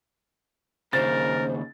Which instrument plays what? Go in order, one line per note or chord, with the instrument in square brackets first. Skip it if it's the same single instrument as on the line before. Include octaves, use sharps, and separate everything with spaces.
[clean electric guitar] D#2 C#3 [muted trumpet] A#4 [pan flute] C5 [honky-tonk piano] A6